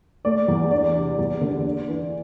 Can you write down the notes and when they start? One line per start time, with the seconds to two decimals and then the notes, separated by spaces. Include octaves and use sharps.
0.25 A3 D5
0.48 E2
0.71 D4 D5
0.95 C3
1.19 E2
1.41 D3
1.64 D4
1.88 E3